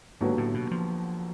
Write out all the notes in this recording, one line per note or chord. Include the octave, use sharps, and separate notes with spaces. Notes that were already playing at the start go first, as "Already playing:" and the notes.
D#2 G#2 D3 F#3 B3
A2
B2
F3